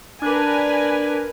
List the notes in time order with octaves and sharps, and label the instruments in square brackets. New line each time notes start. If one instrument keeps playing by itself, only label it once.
[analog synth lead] D4 [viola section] A#4 B4 G#5